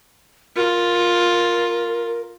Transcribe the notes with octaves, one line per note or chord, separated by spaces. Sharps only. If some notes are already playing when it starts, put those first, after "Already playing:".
F4 A#4